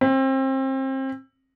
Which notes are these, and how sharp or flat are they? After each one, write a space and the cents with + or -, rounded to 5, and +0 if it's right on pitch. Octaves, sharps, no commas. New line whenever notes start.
C4 +30